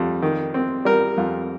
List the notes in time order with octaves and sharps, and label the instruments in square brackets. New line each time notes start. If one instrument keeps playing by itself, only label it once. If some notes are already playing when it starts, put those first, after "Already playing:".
Already playing: [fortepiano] F2 G3
D#3
C4
G3 A#4
F2